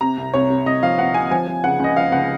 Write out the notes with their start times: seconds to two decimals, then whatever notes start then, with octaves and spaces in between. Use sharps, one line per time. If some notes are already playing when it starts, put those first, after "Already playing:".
0.01 C3 A#5
0.17 C2
0.34 C2 C#5
0.50 C3
0.66 C2 D#5
0.83 F3 F5
0.99 C2 F#5
1.14 C3 G#5
1.31 F3 G#5
1.48 F3
1.64 C#3 F#5
1.80 C#2 D#5
1.96 F3 F5
2.12 C#2 F#5